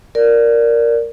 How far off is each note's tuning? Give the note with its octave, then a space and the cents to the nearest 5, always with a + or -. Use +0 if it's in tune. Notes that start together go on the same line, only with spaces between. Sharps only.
A#4 +0 D5 +0